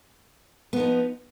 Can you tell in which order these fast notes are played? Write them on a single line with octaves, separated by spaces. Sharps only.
B3 F3 D#4